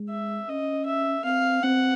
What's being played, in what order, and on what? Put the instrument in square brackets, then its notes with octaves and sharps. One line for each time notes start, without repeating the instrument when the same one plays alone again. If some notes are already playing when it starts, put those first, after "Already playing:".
Already playing: [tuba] G#3
[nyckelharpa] E5
[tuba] C#4 [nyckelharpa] D#5
[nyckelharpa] E5
[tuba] C4 [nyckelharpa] F5
[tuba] C4 [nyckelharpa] F#5